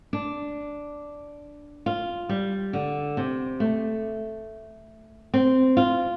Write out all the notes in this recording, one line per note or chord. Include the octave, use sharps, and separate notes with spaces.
D4
F4
G3
D3
C3
A3
C4
F4